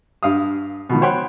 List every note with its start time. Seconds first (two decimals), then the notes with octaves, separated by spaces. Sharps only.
0.23 G2 F5 D#6
0.90 B2 D#3 F3
1.01 C5 C#5 F#5 G5 B5